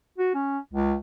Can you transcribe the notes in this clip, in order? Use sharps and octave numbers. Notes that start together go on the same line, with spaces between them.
F#4
C#4
C#2